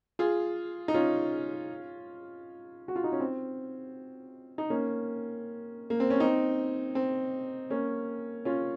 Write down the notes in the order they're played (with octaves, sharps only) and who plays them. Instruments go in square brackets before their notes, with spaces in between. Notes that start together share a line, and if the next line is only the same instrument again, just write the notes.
[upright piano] F4 G#4
D#4
C#4 F4
F#4
F4
D#4
C#4
C4
D#4
A#3 C#4
A#3
C4
C#4
C4 D#4
C4
A#3 C#4
C#4 F4